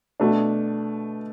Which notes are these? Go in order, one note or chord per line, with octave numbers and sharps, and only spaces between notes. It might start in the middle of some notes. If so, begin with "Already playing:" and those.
B2 A3 D4